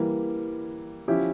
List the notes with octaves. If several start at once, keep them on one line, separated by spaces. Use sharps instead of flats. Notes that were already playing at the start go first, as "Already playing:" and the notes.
Already playing: E3 G3 A#3
F3 C#4 E4 G4